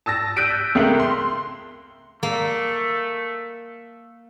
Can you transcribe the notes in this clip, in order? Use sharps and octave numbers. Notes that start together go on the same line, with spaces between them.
A5 E6 A6 A#6
E6 F#6 G6 B6 D7 D#7
C#2 A3 A#4 F5 G5 F#7
C6
A3 A#3